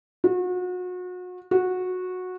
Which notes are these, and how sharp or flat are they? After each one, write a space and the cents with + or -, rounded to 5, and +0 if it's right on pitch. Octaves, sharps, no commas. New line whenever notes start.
F#4 -35
F#4 -15